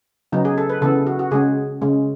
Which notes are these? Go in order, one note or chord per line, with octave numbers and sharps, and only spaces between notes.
C#3 F#3 B3 D#4
G#4
A4
B4
C#3 E3 B3 A4
F#4
F#4
C#3 G#3 C#4 G#4
C#3 G#3 C#4